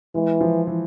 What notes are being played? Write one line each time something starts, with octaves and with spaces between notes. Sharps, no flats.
E3 G#3
F3
E3